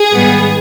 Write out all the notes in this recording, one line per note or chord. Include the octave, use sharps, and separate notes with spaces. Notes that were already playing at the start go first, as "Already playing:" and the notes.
Already playing: G#4
G#2 D#3 G3 B3